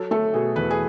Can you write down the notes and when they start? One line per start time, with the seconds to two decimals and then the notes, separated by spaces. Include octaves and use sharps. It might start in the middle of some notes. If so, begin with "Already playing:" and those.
Already playing: F#3 A4
0.11 A3 A4
0.34 B2 G#4
0.56 E2 B4
0.71 G#4